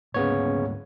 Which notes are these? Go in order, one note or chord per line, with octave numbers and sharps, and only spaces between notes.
D2 G#2 C#3 A#3 B3 C#5